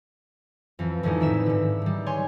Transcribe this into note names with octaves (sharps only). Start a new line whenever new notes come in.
F2 E3
F2 A2 D3 G#3 C#4 D#4
D#3 B4 E5 E6 E7
G#2 D3
D#3 G3
C#5 G#5 C6